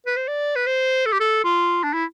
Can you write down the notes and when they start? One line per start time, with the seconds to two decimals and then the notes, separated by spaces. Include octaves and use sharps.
0.07 B4
0.17 C5
0.28 D5
0.56 B4
0.67 C5
1.06 A4
1.12 G4
1.20 A4
1.44 F4
1.84 D4
1.94 E4